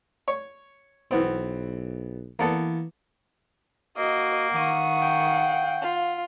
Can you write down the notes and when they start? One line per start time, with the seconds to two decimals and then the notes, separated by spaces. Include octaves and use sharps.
0.28 C#5
1.11 B1 E3 B3 C4
2.39 E3 A#3 B3 A4
3.97 A#3 F#4 D#5
4.52 D#3 F5 F#5 C#6 D#6
5.02 G5
5.81 F4